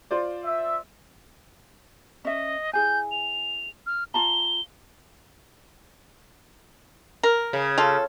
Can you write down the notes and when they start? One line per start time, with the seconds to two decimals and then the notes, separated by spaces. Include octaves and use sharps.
0.11 F4 C5 D5
0.45 E5
2.25 C#4 D#5 E5
2.73 E4 G#4 G#5 G6
3.11 F7
3.86 F6
4.14 F4 A5 A#5 G7
7.23 A#4
7.53 C#3
7.78 F4 A4